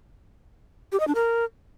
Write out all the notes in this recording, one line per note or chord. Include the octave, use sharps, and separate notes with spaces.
G4
D#5
D4
A#4